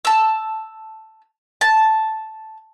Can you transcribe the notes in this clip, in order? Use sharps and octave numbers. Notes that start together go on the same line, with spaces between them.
A5 E6
A5